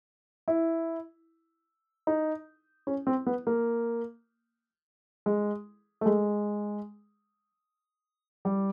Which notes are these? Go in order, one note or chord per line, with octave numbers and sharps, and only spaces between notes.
E4
D#4
C#4
C4
B3
A#3
G#3
A3
G#3
G3